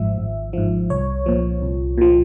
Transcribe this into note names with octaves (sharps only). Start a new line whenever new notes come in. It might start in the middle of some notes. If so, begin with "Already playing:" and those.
Already playing: G#1 G#2 F3 E5
G#1
G#2 F3
C2 C#5
A#2 F3
C2
A#2 F3